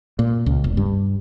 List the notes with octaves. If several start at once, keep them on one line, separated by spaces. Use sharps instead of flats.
A#2
C#2
E1
G2